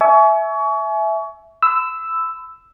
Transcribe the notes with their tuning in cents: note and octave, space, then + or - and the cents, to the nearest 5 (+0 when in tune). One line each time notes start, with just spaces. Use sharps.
E5 +0 G#5 +35 C#6 +30
B5 +45 E6 +0